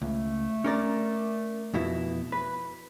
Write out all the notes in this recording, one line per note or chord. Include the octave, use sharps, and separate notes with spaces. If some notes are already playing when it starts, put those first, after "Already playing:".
C#2 A3
C#4 A#4 D5
F2 B2 E4
B4